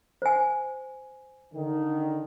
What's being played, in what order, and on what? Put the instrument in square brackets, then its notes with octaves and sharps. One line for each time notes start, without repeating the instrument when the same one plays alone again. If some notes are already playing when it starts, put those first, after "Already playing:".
[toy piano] C5 G#5
[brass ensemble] D3 D#3 D#4